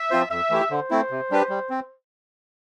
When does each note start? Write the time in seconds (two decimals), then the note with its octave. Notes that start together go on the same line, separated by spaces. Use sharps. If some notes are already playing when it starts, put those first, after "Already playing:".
Already playing: E5
0.10 F3 C4 F4 C5
0.30 F2 E5
0.50 E3 A3 E4 G4
0.70 D3 C5
0.91 A3 C4 E4
1.11 C3
1.31 G3 D4 G4 B4
1.49 G3
1.70 C4